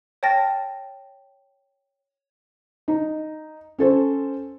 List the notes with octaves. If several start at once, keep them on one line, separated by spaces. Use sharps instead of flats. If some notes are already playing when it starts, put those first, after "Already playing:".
C#5 G5 A5 F6 A6 A#6
D#4
C#4 A4 C5